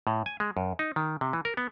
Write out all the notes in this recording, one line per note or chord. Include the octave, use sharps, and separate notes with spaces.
A2
G#5
G#3
F#2
D#4
D#3
C3
E3
A#4
B3